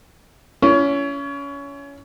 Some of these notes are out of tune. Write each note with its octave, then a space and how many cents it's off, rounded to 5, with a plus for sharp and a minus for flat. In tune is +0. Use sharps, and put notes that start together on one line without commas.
C#4 +25 E4 +45